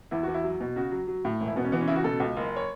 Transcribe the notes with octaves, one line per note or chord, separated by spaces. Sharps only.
E2 E4
E2 F#4
E4
F#3
B2
C#3 F#4
F#3
F#3
A2
E1
E4
B2 B3
C#4
E3 B3
C#4
C#3 E4
F#4
B2 A4
C#2
F#1
C#5